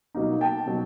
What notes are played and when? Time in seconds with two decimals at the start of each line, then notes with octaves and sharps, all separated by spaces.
0.15 B2 F#3 A#3 D#4
0.41 G5 A5
0.66 B2 F#3 A#3 D#4